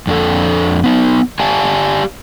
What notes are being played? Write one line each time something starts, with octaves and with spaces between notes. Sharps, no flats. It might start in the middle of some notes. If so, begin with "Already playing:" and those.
F2 D4 A4
B3 D#4
G4 D5 F5 G#5 A5